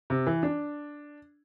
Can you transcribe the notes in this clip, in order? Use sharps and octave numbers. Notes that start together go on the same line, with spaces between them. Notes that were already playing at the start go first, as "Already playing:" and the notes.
C3
E3
D4